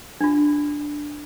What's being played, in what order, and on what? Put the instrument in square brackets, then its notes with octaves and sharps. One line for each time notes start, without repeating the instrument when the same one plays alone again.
[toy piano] D4 F4